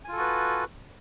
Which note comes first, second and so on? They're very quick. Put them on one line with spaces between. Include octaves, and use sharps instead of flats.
G#5 F4 A4 F#4 B4